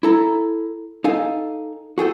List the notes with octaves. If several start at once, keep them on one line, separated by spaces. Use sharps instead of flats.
E4 A4 A#5
D#4 A4 F5 G#5
F#4 G#4 A4 G5